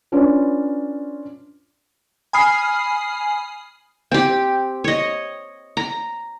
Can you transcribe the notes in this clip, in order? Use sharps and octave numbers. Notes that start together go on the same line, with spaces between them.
C#4 D4 F4 B4
G#5 B5 D#6 F6 C7
C4 G4 G5
C#5 D#5
A#5